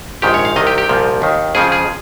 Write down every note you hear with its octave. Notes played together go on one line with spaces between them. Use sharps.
A#1 G#2 D#3 G4
C#5
F5
C2 C3 D#3 D#5
G4
G4
C2 A#2 F3
D#2 D#3
F2 C#3 F3 G#4
G#4